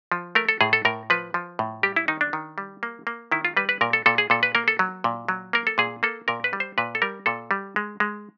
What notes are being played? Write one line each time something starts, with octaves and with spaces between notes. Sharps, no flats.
F3
A3 A#4
A4
A2 G#4
A4
A2 A#4
F3 B4
F3
A2
G3 G4
E4
D#3 D#4
D4
D#3
G3
A#3
A#3
D#3 E4
F4
G3 B4
B4
A#2 A#4
A4
A#2 A4
G#4
A#2 A4
B4
A#3 A#4
A4
F#3
A#2
F#3
A#3 A#4
A4
A#2 G#4
A#3 A4
A#2 A#4
B4
G3
C5
A#2 B4
A4
G3 A#4
A#2 A4
G3
G#3
G#3